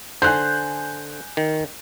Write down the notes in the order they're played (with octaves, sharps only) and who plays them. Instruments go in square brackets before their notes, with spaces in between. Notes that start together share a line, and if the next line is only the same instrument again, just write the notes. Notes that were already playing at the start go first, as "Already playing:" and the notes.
[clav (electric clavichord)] D3 C5 [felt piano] G#5 F#6 G6
[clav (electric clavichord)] D#3